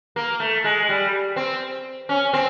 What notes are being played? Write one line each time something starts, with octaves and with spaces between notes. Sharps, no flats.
A#3
A3
G#3
G3
C4
C#4
C4